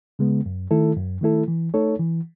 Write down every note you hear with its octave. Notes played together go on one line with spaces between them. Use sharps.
C#3 G#3 B3
F#2
D#3 A3 E4 A4
F#2
D#3 A3 E4 A4
E3
A3 D#4 A4 C#5
E3